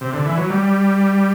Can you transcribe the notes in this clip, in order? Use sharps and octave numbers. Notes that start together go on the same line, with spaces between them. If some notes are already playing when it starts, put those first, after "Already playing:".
C3
D3
E3
F#3
G3